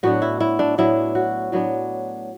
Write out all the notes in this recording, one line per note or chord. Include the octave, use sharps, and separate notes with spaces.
A2 F#3 B3 D4 F#4
E4
E4
D4
A2 F#3 B3 D4 E4
F#4
A2 F#3 B3 D4